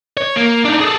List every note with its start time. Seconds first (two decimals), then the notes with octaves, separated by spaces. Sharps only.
0.17 C#5
0.36 A#3
0.65 D4 D#4
0.81 G#4 A4